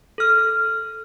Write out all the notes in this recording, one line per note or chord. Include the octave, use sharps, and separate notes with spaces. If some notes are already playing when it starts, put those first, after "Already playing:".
A4 F6